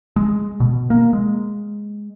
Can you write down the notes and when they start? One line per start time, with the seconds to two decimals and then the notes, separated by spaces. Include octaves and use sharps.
0.16 G#3
0.60 B2
0.90 A#3
1.13 G#3